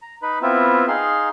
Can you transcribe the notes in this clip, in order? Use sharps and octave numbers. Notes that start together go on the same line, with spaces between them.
A#5
D#4 B4 B5
B3 C4 E4 F4 E5
D#4 G#4 F5 C6